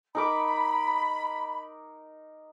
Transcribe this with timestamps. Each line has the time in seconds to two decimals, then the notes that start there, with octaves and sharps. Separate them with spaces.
0.15 D#4 A#4 B5 D6